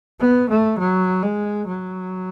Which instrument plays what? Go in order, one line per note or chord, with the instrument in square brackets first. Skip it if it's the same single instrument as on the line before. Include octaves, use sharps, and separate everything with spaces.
[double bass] B3
A3
F#3
G#3
F#3